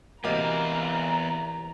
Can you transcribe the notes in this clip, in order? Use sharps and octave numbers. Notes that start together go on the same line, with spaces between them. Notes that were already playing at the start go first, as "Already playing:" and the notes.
E2 C3 E3 A#3 F#4 D#5 F5 A#5